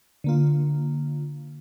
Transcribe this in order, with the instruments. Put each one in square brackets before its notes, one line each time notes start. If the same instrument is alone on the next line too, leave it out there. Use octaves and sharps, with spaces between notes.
[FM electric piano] D3 A#3 F4